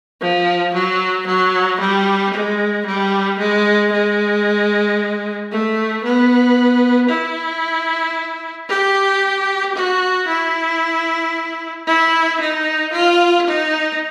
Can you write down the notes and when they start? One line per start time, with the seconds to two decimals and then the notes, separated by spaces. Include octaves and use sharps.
0.21 F3
0.74 F#3
1.27 F#3
1.80 G3
2.34 G#3
2.86 G3
3.39 G#3
3.92 G#3
5.51 A3
6.04 B3
7.09 E4
8.69 G4
9.75 F#4
10.28 E4
11.87 E4
12.40 D#4
12.92 F4
13.47 D#4